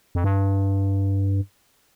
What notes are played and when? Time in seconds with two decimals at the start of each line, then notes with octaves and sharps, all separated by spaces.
0.15 F2
0.24 G2